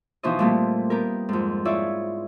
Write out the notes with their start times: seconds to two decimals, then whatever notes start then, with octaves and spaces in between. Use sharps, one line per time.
0.23 B2 E3 F3 D#4 C5 D#5
0.39 A#2 G3 A3 C4 D#4 G4
0.90 B3 G4 A#4
1.29 F2 G#2
1.65 E4 F4 G#4 C#5 D5 E5